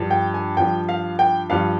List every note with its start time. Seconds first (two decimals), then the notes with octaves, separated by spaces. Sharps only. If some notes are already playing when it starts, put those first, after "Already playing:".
Already playing: G2 F3
0.11 G5
0.34 G#5
0.57 G2 F3 G5
0.89 F5
1.19 G5
1.50 G2 F3 F5